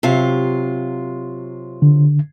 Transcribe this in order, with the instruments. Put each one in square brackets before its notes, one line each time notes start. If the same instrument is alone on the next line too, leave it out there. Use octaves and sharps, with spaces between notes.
[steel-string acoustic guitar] C3 F#3 F4
[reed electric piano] D3